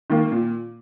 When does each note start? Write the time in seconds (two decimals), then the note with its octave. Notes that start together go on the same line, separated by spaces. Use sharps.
0.10 D#3 A#3
0.32 A#2